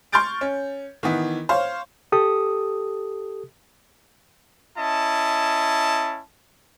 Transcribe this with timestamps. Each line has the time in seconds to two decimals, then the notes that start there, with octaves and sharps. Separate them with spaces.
0.12 C6 C#6 F6 G6 A6 D7
0.41 C#4
1.03 D#3 E3 B3
1.49 C5 C#5 F5
2.12 G4 A4 D#6
4.77 C#4 E4 D#5 A5